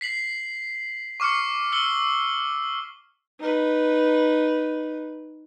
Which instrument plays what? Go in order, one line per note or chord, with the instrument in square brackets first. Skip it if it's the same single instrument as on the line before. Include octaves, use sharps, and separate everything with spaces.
[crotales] B6 C7 F#7
C#6 D6 F6 C7 C#7
E6 C#7 G7
[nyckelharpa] D#4 B4